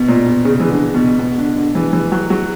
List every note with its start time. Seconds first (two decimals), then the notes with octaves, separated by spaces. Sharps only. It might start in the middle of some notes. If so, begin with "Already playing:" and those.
Already playing: B2
0.08 A#2
0.26 B2
0.45 C#3
0.60 E3
0.70 D3
0.94 B2
1.19 B2
1.38 D3
1.56 D3
1.75 E3
1.93 E3
2.12 F#3
2.30 F#3